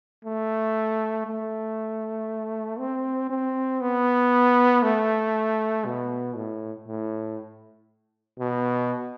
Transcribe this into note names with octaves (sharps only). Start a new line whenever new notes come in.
A3
A3
C4
C4
B3
A3
B2
A2
A2
B2